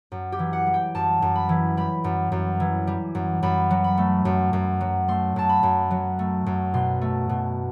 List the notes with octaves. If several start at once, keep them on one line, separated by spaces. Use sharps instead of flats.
F#2
G4
E3
F#5
G3
G5
F#2 A5
F#2
B5
E3
G3 B5
F#2
F#2
E3
G3
F#2
F#2 B5
F#3
B5
A3
F#2
F#2
F#3
A3 C6
F#2 A5
B5
F#2
F#3
A3
F#2
B2 C6
A3
B2